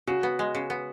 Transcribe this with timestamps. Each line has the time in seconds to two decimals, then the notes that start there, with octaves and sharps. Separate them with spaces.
0.07 C#3 F#4
0.23 B3
0.39 G#3
0.55 C#3
0.70 B3